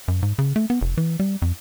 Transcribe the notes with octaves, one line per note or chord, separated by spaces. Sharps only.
F#2
G#2
C#3
A3
B3
F1
E3
G3
F2